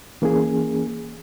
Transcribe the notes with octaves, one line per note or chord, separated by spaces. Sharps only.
E3 A#3 C#4 G#4